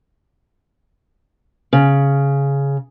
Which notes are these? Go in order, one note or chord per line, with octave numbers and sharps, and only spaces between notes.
C#3